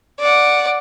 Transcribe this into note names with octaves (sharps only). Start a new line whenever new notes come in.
D5 F#5